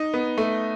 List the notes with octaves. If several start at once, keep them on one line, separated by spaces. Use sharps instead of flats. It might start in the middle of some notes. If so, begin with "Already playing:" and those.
Already playing: D#4
B3
A3